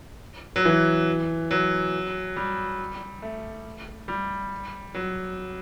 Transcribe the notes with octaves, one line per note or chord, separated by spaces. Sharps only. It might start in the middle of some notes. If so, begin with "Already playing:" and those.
F#3
E3
F#3
G3
A3
G3
F#3